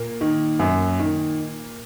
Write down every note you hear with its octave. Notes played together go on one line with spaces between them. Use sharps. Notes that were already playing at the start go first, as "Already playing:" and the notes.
Already playing: A#2 A#3
D#3
F#2
D#3